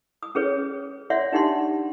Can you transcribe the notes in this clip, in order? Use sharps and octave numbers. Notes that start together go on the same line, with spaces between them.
D#6
C#4 G#4 B4 C#5
C#5 D5 E5 F#5 C6
D4 D#4 G4 F#5 C6